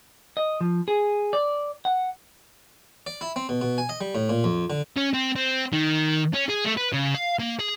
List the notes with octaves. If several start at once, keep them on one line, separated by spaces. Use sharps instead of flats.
D#5
F3
G#4
D5
F#5
D5
E4
C4
B2
B2
G#5
D#5
G3
A2
A#2
F2
D3
C#4
C4
C4
D#3
C#4
G#4
A3
B4
C#3
F5
A#3
G#4